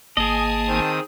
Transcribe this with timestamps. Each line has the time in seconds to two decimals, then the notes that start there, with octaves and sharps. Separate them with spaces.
0.17 G#1 A#3 G#4 D#5 G#5 A5
0.68 D#3 C4 D#6